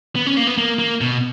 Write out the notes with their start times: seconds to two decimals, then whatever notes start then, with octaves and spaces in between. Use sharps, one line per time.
0.16 B3
0.26 C#4
0.37 A#3
0.47 B3
0.58 A#3
0.79 A#3
1.01 B2